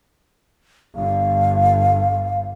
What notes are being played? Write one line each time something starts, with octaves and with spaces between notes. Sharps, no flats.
G1 G2 D3 F5